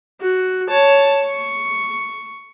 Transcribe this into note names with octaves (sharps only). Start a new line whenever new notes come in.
F#4
C#5 A5
C#6